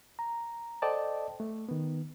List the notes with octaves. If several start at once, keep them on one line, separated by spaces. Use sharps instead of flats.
A#5
A4 C5 D5 D#5 G5 A5
A3
D#3 B3